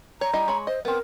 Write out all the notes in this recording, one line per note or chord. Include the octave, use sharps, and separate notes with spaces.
C#5 A#5
G3 E4 D#5
G#3 C#5 B5
C5 D#5
B3 C4 A#4